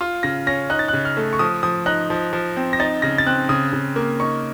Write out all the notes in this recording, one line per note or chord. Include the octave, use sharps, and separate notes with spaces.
F4
C#3 A#6
C#4 A#6
D#4 F#6
A6
F#6
C#3
F6
A3
C#6
F3 D#6
F3 D#6
D#4 F#6
F3
F3
C4
A#6
D#4 A6
C#3 A#6
A6
C4 F#6
C#3 D#6
C#3
A#3
D#4 C#6